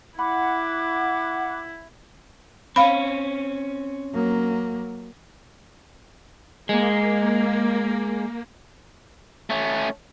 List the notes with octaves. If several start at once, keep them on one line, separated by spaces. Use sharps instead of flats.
E4 F#5 B5 D6
C4 C#4 F5 B5
F#3 A#3
G#3 A#3
A3 C#4